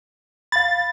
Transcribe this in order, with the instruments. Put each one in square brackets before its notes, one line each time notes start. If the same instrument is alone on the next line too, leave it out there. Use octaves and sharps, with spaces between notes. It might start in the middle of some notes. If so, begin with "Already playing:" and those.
[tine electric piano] F5 B5 [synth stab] A6